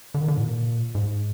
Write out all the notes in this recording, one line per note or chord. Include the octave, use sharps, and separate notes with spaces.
D3
D#3
D3
G#2
A#2
G#2